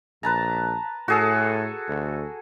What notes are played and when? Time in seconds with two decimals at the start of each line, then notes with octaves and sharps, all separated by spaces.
0.23 A#1 B4 A5 A#5
1.08 A2 F#4 G#4 A4
1.88 D2